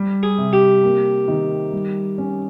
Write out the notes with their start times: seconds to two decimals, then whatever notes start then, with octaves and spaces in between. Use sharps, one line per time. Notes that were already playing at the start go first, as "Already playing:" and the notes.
Already playing: G3
0.23 G#4
0.38 C3
0.53 G4
0.83 A#3
1.28 D#3
1.73 G3
2.18 C#4